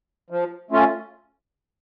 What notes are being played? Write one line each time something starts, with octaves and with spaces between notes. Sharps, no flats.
F3
A3 C#4 F4